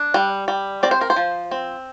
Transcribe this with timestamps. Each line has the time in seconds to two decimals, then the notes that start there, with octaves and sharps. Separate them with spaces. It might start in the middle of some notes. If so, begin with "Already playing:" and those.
Already playing: D4
0.14 G3
0.48 G3
0.83 C4 D5
0.91 C5
1.01 A#4
1.10 C5
1.16 F3
1.51 C4